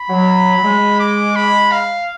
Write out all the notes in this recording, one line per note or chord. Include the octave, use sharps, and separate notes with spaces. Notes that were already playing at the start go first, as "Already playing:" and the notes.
Already playing: B5
F#3
F#3
G#3
D6
B5
F5